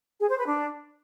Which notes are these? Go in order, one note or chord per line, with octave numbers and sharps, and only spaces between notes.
G#4
C5
B4
D4